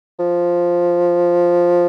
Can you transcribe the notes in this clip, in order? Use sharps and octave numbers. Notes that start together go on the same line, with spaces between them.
F3